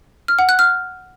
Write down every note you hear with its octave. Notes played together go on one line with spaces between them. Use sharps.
F6
F#5
F#6
F6